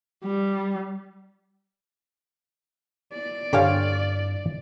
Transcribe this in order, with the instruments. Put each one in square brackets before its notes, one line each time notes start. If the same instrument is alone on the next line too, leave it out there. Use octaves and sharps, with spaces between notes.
[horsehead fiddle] G3
D5
[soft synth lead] G2 [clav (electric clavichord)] D3 G4 G#5 [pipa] C5 C#5 F5